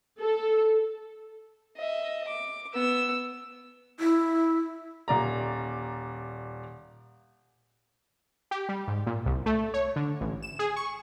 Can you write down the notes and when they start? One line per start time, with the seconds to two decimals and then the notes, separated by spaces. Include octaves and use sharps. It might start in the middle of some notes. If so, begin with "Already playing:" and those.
0.20 A4
1.77 D#5 E5
2.27 D6
2.74 B3 E6
4.00 E4
5.08 D#1 D5 A#5
8.51 G4
8.69 G3
8.88 G#2
9.06 A#2
9.26 C2
9.46 A3
9.74 C#5
9.96 D3
10.21 A1
10.42 E7
10.59 G#4
10.76 C#6